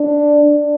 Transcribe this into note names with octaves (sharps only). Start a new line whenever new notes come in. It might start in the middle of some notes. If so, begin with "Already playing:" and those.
Already playing: D4
D4